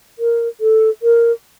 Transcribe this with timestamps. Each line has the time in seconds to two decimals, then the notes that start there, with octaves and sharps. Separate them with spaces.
0.19 A#4
0.61 A4
1.02 A#4